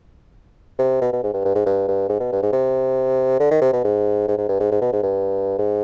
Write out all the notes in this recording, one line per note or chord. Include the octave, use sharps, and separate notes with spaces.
C3
B2
B2
G#2
G2
G2
G#2
G2
G2
G#2
B2
G2
G#2
C3
D3
D#3
C3
B2
G#2
G#2
G#2
G2
G#2
G#2
B2
G#2
G2
G#2